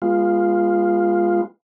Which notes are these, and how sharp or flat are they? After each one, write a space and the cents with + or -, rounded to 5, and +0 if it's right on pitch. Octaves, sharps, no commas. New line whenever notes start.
G#3 -20 B3 -35 F4 +0